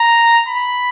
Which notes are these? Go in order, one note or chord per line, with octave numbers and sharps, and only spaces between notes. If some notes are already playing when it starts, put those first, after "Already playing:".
Already playing: A#5
B5